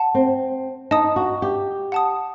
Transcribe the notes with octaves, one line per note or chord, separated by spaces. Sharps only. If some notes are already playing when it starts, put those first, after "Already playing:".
Already playing: F#5 A5
C4
D#4 D#5 A5 D#6
F#4
G4
F#5 A5 D#6